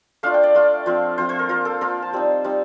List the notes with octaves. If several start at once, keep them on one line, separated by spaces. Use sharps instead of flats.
A3 D4 F4 F5
G5
D5
A3 D4 F4
F3 C4 F4
F3 C4 F4 C5
C5
A#4
A#3 F4 A#4
A4
A#3 F4 A#4
A5
G3 C4 D#4
G3 C4 D#4